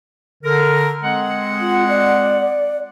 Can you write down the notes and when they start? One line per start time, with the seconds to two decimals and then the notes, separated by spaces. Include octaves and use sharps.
0.44 D3 A#4
1.03 G#3 C4 F#5
1.61 F4
1.89 D5